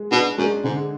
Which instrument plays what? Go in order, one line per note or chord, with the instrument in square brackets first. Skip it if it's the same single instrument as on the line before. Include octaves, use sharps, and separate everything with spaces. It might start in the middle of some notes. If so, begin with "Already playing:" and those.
Already playing: [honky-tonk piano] G#3
[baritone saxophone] B2 [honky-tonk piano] D4
[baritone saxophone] F#2 [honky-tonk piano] G#3
[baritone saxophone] G#2 [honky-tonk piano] D3